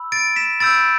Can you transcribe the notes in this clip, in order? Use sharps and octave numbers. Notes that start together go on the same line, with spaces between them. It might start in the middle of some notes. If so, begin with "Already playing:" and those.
Already playing: B5 E6
A6 D7
B6 E7
B5 E6 G6 A6 D7